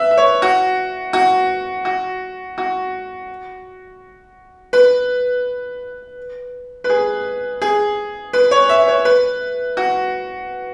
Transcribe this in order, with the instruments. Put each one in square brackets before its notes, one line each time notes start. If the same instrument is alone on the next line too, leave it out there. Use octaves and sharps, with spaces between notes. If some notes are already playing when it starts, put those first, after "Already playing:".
Already playing: [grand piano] B4 E5
E5
C#5
F#4
F#4
F#4
F#4
B4
B4
G#4
G#4
B4
C#5
E5
C#5
B4
F#4